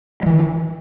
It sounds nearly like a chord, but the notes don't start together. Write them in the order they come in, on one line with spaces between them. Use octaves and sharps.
G3 E3 D#3